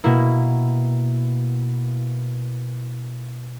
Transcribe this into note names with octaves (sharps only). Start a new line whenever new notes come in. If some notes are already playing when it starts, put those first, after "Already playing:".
B2 A#3 E4